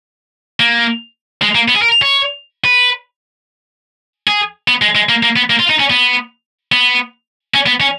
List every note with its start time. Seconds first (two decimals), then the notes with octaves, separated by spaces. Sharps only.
0.60 A#3
1.42 G#3
1.55 A#3
1.68 B3
1.75 G#4
1.82 A#4
2.02 C#5
2.64 B4
4.27 G#4
4.68 B3
4.82 G#3
4.95 G#3
5.09 A#3
5.23 A#3
5.36 B3
5.50 A#3
5.59 F4
5.70 D#4
5.80 C#4
5.90 B3
6.72 B3
7.54 C#4
7.67 B3
7.81 C#4